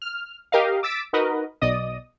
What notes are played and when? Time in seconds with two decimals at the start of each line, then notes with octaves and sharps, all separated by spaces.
0.02 F6
0.52 G4 A#4 D#5 F5
0.83 D6 E6 A6 B6 D7
1.13 D#4 F#4 A#4 B4 D#5
1.61 B1 B2 D5 D#5 D#6